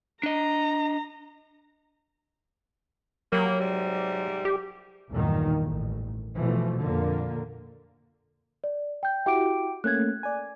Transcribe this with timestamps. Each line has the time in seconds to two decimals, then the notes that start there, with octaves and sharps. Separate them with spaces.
0.23 D4 D#5 A#5
3.33 F#3 G3 A#3
3.60 G#2 C3 G3
4.45 G4
5.11 B1 E2 G2 A#2 D#3
5.62 A1
6.38 B2 E3 F3 A3
6.81 F2 A#2 D3 A#3
8.64 D5
9.03 G5 G6
9.26 E4 F#4 G4 G5 D6 D7
9.84 A3 A#3 C#4 F#6 G#6
10.23 D5 G#5